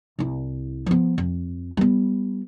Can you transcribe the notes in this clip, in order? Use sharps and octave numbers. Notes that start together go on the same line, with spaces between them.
C2 E4
F3 B3
F2
G3 B3